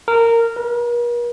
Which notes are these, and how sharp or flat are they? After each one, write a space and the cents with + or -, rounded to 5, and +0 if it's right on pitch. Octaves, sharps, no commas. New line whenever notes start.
A#4 -15
A#4 +45